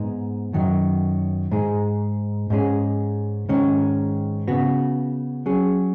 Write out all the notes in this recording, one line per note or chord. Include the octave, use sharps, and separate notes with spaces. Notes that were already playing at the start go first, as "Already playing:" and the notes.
Already playing: G#2 G#3 B3 D#4
F#2 D#3 F#3
G#2 G#3 D#4 G#4
G#2 G#3 C#4 G#4
G#2 D#3 G#3 C#4
C#3 B3 F#4
F#3 C#4 G#4